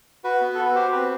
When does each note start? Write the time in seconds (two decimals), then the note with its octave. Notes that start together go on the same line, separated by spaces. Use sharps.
0.24 F#4 B4
0.41 B3
0.55 F#4 A4
0.65 B4
0.75 G4 C5
0.93 C4 B4